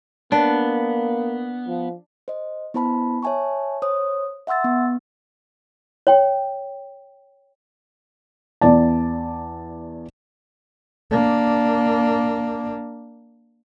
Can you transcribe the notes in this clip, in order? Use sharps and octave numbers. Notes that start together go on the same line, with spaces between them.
A#3 B3 D4
F3
C5 D#5
B3 E4 C5 A5 B5
C#5 E5 G#5 A5 C#6
C5 C#5 D#6
E5 F#5 C6 E6 A6
B3
C#5 G5
E2 D5 A5
A#3 D4